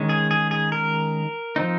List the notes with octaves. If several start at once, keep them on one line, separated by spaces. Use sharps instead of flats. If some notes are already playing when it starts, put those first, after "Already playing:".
Already playing: D#3 G#3 C#4
G#4
G#4
G#4
A#4
F3 C4 D#4